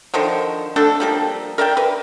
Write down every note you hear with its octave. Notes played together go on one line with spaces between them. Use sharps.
D3 D#3 F3 C5
A3 D4 F#4 A4
F3 G3 A#3
A#4 D5 E5 G5
B4